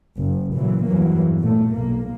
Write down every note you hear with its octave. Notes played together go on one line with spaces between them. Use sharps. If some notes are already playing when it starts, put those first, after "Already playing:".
F#1
A#2 C#3 E3 F#3
E2 G2 E3 F#3 A#3
A#2 A3
B1 A#3